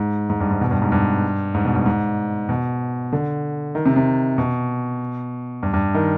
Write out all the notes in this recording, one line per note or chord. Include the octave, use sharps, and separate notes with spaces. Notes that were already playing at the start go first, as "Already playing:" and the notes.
Already playing: G#2
G#2
G2
G#2
B2
G2
G#2
G2
G#2
B2
G2
G#2
B2
D3
D#3
C3
C3
B2
G2
G2
D#3